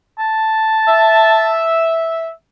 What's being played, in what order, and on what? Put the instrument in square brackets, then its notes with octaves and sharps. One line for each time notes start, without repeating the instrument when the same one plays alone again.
[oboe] A5
[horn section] E5